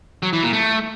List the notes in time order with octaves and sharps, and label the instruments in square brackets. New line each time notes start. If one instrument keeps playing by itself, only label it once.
[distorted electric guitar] F#3
E3
A#2
A3